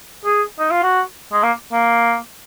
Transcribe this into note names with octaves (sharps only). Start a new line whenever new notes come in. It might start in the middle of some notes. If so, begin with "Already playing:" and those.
G#4
D#4
F4
F#4
G#3
A#3
A#3